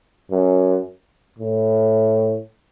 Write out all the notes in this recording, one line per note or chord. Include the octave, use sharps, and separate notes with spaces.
F#2
A2